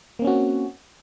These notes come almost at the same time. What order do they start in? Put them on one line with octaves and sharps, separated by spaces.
A#3 C4 C#4 F#4